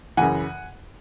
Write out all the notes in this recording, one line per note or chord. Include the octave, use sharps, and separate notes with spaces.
F#2 C#3 E3 F#5 G#5